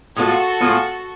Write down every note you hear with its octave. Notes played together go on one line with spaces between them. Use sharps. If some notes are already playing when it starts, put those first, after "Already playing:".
A2 G#3 B3 F4 F#4 A4
A2 G#3 B3 F4